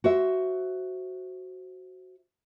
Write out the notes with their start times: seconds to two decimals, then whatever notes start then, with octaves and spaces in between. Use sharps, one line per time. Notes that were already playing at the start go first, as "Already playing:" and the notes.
0.04 F#4 C5 E5